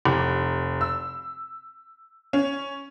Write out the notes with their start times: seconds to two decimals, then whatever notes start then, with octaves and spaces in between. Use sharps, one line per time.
0.05 F1
0.81 E6
2.33 C#4